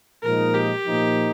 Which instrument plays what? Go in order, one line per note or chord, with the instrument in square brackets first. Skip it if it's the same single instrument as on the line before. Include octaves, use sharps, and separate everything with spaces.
[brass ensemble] A#2 F3 G#3 D#4 [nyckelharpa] A#4
[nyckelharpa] G4
[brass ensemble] A#2 F3 A#3 D#4